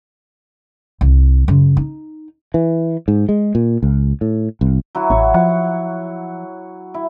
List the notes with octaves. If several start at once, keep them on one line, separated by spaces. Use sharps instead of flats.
C2
F#2 C#3
D#4
E3
G#2
G#3
A#2
C#2
A2
C2
F#3 E4 F#4
A1 C#5
F3 F#5
E4